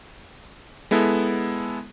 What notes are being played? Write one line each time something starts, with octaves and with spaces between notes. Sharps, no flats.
G#3 B3 E4 A4